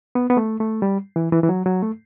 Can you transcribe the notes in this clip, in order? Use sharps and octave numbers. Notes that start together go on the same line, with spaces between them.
B3
B3
A3
A3
G3
E3
E3
E3
F#3
F#3
A3